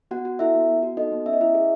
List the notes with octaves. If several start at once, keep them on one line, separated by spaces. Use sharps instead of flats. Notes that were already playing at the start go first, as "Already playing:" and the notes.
B3 F#4 F#5
F#4
E4 A4 E5
B3
B3
F#4
D#4 A4 D#5
B3
C#4 E5
D#5
E4 E5
G#4